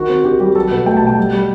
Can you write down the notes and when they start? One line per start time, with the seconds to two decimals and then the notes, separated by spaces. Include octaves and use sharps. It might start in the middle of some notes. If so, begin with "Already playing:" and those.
Already playing: D#3 F#4
0.09 C4
0.24 D#3 G4
0.40 G3 G4
0.56 F#3 A4
0.71 B2 B4
0.86 A3 G5
0.97 A5
1.02 B2 G5
1.17 G3
1.33 G3